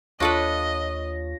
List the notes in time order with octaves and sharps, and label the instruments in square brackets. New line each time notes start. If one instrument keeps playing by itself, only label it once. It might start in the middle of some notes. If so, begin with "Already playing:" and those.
[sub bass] D#2 [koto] D4 A4 B4 [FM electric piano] F4 C#5 A#6 [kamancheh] D#5